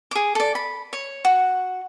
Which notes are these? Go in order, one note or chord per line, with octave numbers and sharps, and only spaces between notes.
G#4 D6
A4 D5
B5
C#5
F#4